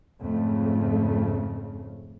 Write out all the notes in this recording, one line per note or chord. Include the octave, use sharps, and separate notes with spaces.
F2 G#2 C#3 A3